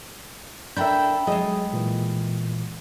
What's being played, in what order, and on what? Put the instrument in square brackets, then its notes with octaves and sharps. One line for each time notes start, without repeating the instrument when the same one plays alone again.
[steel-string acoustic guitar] D4 A4 A#4 [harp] E5 G5 B5 [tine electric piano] G6
[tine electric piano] F#3 G#4 [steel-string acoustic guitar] G#3 A3 [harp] D#5
[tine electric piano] A#2 E3